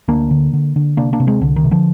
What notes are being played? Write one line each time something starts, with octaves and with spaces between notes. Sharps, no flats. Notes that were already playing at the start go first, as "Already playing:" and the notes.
D2 A#3 D4
D3
D3
D3
C3 A#3 D4
A#3 D4
C3
G#3 C4
C2 D3
D#3
C3
D3 F3